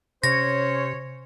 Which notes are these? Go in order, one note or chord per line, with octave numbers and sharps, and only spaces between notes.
C3 C#4 C5 C#5 A#6